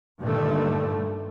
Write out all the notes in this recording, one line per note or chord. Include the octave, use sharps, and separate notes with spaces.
G2 A#2 D3 D#3 G3 A3